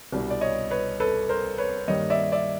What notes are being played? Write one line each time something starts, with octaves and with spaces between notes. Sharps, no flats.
C2 B2 G3 B3 D4
D5
C#5 D#5
B4 C#5
A4 B4
A#4 C5
B4 C#5
G2 D#3 G3 A#3 C#5 D#5
D5 E5
D5 E5